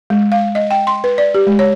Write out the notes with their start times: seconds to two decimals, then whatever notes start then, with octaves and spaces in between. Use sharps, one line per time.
0.10 G#3
0.32 F5
0.55 D#5
0.71 G5
0.87 C6
1.04 B4
1.18 D5
1.34 G4
1.47 G#3
1.59 C#5